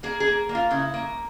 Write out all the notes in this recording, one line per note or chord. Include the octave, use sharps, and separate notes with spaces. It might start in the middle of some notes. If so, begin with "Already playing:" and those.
A#3 G#4
G#4
A#3
A#3
F4
C#3 E4
A#3